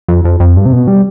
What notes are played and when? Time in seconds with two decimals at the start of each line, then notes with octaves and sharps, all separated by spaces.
0.08 F2
0.25 F2
0.40 F2
0.57 G2
0.65 C3
0.72 B2
0.88 G3